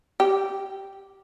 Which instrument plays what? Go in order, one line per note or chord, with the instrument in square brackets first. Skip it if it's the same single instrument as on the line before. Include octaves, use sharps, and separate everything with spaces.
[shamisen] G4